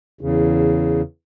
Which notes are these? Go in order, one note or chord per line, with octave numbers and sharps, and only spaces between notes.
E2 C#3